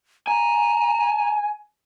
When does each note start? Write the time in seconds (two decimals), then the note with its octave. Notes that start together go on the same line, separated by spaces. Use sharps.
0.27 G#5 A#5